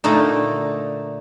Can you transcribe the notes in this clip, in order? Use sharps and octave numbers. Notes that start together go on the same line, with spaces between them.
A#2 D3 A3 D#4